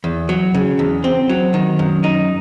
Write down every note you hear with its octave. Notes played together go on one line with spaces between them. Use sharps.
E2
F#3
C#3
E2
C4
F#3
D#3
F#2
D#4